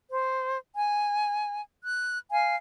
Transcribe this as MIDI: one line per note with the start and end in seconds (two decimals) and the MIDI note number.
0.10 0.56 72
0.77 1.61 80
1.84 2.18 90
2.31 2.55 77
2.31 2.55 80